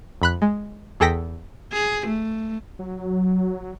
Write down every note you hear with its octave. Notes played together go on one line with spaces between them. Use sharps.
F2 B5 F#6
G#3
E2 G#4 A4 G5 A#6 B6
G#4
A3
F#3